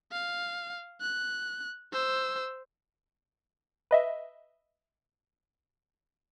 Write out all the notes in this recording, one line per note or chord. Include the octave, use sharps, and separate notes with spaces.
F5
F#6
C5 E6
B4 D#5 E5